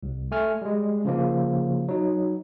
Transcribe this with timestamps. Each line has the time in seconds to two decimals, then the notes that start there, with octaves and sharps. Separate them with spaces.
0.03 C2
0.32 A3 G#5 F6
0.62 G3 G#3
1.05 C#3 F3 A#3
1.88 F#3 D#4